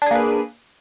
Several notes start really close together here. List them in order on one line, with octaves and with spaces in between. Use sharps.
D4 G#4 A#3 B4